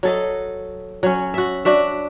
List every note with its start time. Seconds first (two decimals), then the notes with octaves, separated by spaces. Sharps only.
0.03 F#3 A4 D#5
1.03 F#3 C#4
1.34 F#4 E5
1.65 D4 F#4 E5